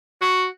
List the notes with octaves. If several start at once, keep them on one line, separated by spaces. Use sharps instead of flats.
F#4